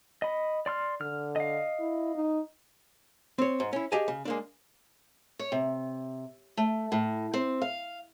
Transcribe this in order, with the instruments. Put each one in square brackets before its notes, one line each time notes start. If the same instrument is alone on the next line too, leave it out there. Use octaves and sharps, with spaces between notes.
[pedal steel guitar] D#5 B5
D5 C6 F6
[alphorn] D3 [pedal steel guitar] F6
[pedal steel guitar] D#5 F5
[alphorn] E4
D#4
[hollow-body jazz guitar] C4 C#5
G#2
C#4 E4
G4 G#4 D#5 F5 G#5 A5
C#3
G#3 A#3 D4
[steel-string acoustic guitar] C#5
C3
A3
A2
C4
F5